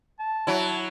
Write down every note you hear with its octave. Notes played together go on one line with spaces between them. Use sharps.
A5
F#3 E4